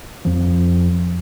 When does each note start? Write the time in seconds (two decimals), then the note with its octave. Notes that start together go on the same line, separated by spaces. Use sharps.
0.25 F2 F3